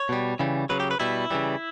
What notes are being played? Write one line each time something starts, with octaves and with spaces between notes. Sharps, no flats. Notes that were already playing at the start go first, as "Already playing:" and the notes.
Already playing: C#5
B2 G3
C#3 E3 G3
C#3 F#3 B4
G4
B4
B2 G3 E4
C#3 E3 G3